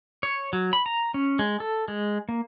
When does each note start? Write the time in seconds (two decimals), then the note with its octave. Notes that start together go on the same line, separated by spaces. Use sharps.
0.23 C#5
0.53 F#3
0.73 B5
0.86 A#5
1.14 C#4
1.39 G#3
1.60 A4
1.88 G#3
2.29 A#3